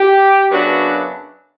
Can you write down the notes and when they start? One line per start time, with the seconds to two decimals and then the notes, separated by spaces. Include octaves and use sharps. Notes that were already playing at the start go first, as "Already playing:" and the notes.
Already playing: G4
0.51 F#2 C#3 F#3 B3 D4 F#4